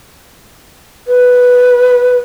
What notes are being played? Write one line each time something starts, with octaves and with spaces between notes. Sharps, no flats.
B4